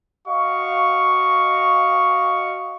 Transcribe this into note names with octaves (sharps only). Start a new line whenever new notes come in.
F#4 D#5 F5 C#6